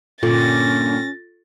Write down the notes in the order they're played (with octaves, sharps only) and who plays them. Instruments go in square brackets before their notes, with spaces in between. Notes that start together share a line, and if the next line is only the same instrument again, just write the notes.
[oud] G2 A#2 D3 [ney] C#4 [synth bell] F4 A4 [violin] A6 A#6